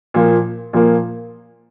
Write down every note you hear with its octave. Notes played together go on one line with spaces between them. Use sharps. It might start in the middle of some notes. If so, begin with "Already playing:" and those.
A#2 F3 A#3
A#2 F3 A#3